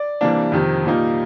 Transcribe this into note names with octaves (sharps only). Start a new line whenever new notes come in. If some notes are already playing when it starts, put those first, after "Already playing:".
Already playing: D5
C3 E3 G3 A#3 D4
F2 C3 D#3
A#2 G3 A#3 D#4